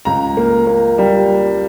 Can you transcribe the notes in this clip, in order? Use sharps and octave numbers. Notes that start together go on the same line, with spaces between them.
C#2 A#5
A#3
A#3
G3